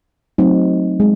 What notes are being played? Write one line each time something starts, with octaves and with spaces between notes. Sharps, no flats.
F#3 A3 C4 D#4
G#3